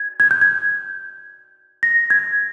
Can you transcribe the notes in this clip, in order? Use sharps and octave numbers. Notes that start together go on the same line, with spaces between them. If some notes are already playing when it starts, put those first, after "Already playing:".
Already playing: G#6
G#6
G6
G#6
A#6
G#6